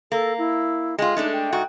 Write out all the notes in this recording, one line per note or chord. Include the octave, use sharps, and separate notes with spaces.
A#3 A4
E4
G#3 F4 G5
G#3 A3 D4 D#4
G5
G#2 F#4